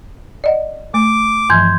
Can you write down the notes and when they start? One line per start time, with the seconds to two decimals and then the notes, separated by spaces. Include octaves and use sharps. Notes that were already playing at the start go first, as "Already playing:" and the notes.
0.44 D5 D#5 F#5
0.94 A3 D6
1.50 G2 E3 F3 C6 G6 G#6